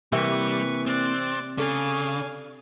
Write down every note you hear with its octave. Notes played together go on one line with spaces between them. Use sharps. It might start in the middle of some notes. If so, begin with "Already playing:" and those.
C3 E3 G3 A#3 B4 E5 C#6
C4 D5 F#6
C#3 D4 A4 F5 G#5